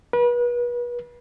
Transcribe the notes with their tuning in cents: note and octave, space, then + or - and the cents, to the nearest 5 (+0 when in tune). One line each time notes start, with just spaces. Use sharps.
B4 -35